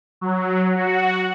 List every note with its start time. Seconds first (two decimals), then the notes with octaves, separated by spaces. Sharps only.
0.21 F#3
0.76 F#4